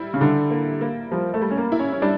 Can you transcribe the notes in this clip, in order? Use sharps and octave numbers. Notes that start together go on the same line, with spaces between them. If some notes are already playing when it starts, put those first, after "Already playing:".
Already playing: G3 E4
C#3
D3 G3
A#3
A#3
F3 G3
A3
G3
C#4
A#3
E4
C#4
C#4
G3 D4